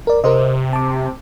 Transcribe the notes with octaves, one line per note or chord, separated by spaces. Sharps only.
A#4 D5
C3 A#4 C5 D#5
A5 D6